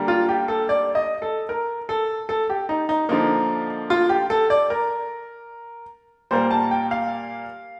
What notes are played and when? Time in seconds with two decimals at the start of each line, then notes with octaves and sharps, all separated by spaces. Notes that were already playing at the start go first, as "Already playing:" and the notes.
Already playing: D3 G3 A#3
0.08 F4
0.29 G4
0.48 A4
0.69 D5
0.95 D#5
1.22 A4
1.49 A#4
1.89 A4
2.29 A4
2.50 G4
2.69 D#4
2.89 D#4
3.09 D3 F3 A#3 D#4
3.90 F4
4.09 G4
4.30 A4
4.50 D5
4.70 A#4
6.31 A#2 G3 A#3 C5
6.51 A5
6.71 G5
6.91 F5